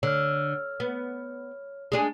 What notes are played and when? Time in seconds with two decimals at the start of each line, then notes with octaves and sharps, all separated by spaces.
0.03 D3 C#5 F6
0.80 B3
1.92 G#3 D4 G#4